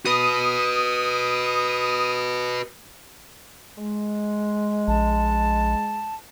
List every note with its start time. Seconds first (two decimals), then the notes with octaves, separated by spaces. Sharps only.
0.06 F#4 B4 D#6
3.78 G#3
4.88 A#1 A5